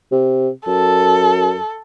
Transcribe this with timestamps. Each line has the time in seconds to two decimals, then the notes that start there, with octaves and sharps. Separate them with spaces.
0.12 C3
0.67 F#2 A4